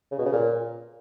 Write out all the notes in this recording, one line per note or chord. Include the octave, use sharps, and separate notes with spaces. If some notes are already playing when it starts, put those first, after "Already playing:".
C#3
B2
C#3
A#2